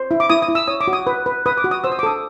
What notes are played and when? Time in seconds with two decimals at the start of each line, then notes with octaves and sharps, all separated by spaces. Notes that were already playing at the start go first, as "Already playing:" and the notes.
Already playing: C5
0.11 E4
0.20 D6
0.30 E4 D#6
0.42 D#6
0.49 E4
0.55 E6
0.68 C#5 D#6
0.81 D6
0.88 F#4
0.93 D#6
1.07 B4
1.26 B4
1.46 B4 D#6
1.58 D6
1.64 F#4
1.71 D#6
1.84 C5 E6
1.92 D#6
1.99 D6
2.03 A4 D#6